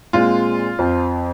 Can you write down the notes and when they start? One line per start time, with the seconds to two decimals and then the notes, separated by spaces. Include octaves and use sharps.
0.13 A#2 G#3 C4 F4
0.79 F2 F3 C4